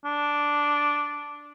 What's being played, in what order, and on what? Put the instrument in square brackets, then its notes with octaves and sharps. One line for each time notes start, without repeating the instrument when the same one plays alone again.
[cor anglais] D4